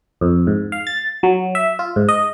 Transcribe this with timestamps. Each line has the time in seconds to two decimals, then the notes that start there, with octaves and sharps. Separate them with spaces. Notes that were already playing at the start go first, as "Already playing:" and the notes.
0.21 F2
0.47 G#2
0.72 F5
0.87 A6
1.23 F#3
1.55 E5
1.79 F4
1.96 G#2
2.09 D#5